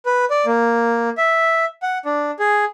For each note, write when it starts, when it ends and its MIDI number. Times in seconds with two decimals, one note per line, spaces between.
0.06 0.25 71
0.30 0.45 74
0.46 1.09 58
1.18 1.65 76
1.83 1.98 78
2.05 2.31 62
2.39 2.65 68